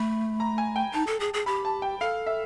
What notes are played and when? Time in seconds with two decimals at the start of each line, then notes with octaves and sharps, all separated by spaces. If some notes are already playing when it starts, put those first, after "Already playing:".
Already playing: A3 B5
0.40 A#5
0.58 G#5
0.76 G5
0.93 D#4 A5
1.07 A4
1.20 G#4
1.34 G#4
1.46 G4 B5
1.65 A5
1.82 G5
2.00 A4 F5
2.27 E5